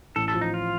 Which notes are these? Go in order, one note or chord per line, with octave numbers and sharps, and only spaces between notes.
A1 A4
A4
F3
D#4
F4